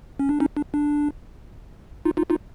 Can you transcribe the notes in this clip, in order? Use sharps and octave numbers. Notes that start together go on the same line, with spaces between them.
C#4
D4
C#4 D#4
D4
D4
D#4 F4
D#4 F4
D#4 F4